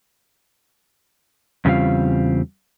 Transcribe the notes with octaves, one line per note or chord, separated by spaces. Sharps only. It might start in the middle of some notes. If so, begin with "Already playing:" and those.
E2 C#3 G3 C4 F4 F5